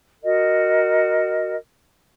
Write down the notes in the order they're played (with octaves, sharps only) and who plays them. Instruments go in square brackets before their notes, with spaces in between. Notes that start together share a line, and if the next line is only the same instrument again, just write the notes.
[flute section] F#4 A#4 D#5